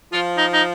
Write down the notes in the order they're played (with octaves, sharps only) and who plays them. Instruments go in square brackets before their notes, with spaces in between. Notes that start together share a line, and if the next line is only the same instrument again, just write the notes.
[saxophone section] F3 [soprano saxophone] F4
[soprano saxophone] D#4
D#4